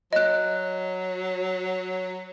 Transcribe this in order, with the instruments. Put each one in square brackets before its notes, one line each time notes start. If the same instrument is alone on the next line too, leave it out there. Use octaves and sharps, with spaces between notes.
[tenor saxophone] F#3 [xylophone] D#5 F#6